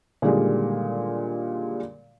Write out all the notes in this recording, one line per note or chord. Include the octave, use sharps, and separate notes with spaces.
A#2 D3 D#3 G3 G#3